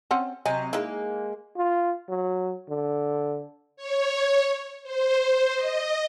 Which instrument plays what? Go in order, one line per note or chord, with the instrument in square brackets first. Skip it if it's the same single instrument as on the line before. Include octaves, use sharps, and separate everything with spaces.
[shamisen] C4 C#4 F#5
[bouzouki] C3 F#3 D#5 [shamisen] G#5
[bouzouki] G#3 A#3 [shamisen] D#4 E4
[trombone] F4
F#3
D3
[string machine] C#5
C5
D#5